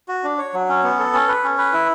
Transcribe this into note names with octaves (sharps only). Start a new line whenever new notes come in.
F#4
D4
C#5
F#3
C#4
B3
A4
C#4
B4
C#4
B4
E4